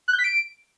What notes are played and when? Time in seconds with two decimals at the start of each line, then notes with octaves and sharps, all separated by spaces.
0.08 F#6
0.13 G6
0.19 B6
0.24 D7